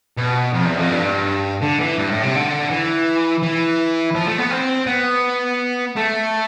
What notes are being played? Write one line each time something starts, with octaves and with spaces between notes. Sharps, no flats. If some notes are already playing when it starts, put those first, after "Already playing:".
B2
F2
E2
F2
G2
D3
E3
G2
A2
C3
D3
E3
E3
F3
A3
B3
C4
B3
A3